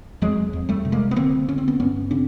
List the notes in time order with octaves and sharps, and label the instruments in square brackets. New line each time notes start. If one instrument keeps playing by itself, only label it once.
[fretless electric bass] F2 F#3 G#3
F2
G3 A3
C3
G#3 A#3
B3
D3 A#3 C4
D3 C#4
C4
B3 C#4
G2 B3 C#4
C#3 C4 D4